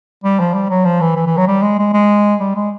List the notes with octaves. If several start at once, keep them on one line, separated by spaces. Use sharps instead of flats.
G3
F3
G3
F#3
F3
E3
E3
E3
F#3
G3
G#3
G#3
G#3
G3
G#3